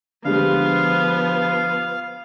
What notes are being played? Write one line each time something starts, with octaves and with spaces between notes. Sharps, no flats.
D3 F3 G3 G#3 B3 F5